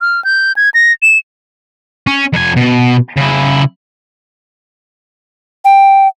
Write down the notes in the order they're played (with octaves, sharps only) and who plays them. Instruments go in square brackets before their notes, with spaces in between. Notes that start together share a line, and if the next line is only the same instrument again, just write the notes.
[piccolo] F6
G6
G#6
A#6
E7
[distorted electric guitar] C#4
F2 G#5
B2
C#3 E4
[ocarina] G5